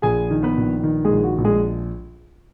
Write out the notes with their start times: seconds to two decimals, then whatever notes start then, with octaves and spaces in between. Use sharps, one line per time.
0.02 A#1 G#4 G#5
0.30 D#3
0.43 B3 B4
0.57 A#1
0.83 D#3
1.04 G#3 G#4
1.11 A#1
1.24 F#4
1.38 A#1
1.45 G#3 G#4